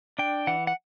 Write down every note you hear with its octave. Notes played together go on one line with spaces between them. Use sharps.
D4 G5
E3 F#5
F#5